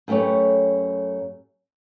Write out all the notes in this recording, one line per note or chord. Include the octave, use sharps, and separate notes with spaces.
F#2 A3 G4 B4 C#5